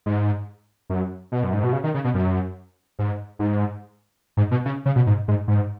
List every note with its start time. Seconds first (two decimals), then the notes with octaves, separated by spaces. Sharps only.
0.06 G#2
0.90 F#2
1.32 B2
1.44 F#2
1.53 G#2
1.63 B2
1.72 C#3
1.84 D#3
1.94 C#3
2.04 B2
2.14 F#2
2.99 G#2
3.39 G#2
4.37 G#2
4.51 B2
4.65 C#3
4.86 C#3
4.96 B2
5.07 G#2
5.28 G#2
5.48 G#2